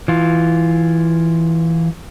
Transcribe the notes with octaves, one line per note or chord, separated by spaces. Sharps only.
E3 F4